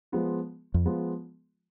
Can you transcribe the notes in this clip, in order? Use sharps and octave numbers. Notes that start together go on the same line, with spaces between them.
F3 G#3 B3 F4
F2
F3 G#3 B3 F4